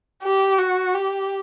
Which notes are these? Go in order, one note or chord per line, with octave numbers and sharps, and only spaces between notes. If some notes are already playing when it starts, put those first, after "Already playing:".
G4
F#4
G4